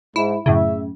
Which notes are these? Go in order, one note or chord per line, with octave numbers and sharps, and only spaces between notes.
G#2 E4
F#2 A2 C#3 E5